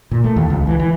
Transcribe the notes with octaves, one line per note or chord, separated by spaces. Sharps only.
A#2
A3
D#2
C#2
E3
E3